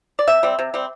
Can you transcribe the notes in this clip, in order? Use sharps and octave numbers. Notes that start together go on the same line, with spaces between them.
D5
C3 E5
G3 C4
C3
G3 C4